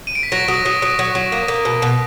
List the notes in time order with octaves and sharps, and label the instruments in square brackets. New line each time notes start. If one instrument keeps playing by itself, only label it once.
[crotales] D#7
D7
B6
[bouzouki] F#3 [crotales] A#6
[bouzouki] F#3 [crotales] D#6
[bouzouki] F#3 [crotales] D#6
[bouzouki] F#3 [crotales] D#6
[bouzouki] F#3
F#3
A#3
A#3
B2
B2